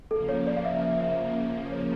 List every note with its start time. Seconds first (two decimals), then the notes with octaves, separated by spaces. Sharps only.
0.10 C#3 F3 A#3 A4
0.29 C#5
0.47 D5
0.57 F5
0.65 E5
0.82 E5
1.01 E5
1.72 C#5